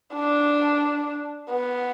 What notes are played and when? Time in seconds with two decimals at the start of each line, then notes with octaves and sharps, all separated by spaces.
0.13 D4
1.51 B3